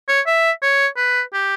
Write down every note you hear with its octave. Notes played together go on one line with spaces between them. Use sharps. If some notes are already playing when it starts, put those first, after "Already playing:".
C#5
E5
C#5
B4
G4